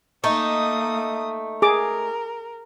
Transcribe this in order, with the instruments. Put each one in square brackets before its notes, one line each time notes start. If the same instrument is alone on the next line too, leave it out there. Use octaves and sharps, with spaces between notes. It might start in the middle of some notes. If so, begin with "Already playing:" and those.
[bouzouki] A3 D#4 [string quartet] A#3 D#6
[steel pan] G#4 D6 [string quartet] A#4